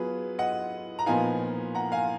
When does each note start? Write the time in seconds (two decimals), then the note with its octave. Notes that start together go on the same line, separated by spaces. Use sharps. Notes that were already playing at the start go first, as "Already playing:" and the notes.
Already playing: F#3 B3 F4 G#4 B4
0.39 D#5 F#5
0.99 A#5
1.06 A#2 F3 B3 D#4 F5 G#5
1.75 F#5 A#5
1.92 F5 G#5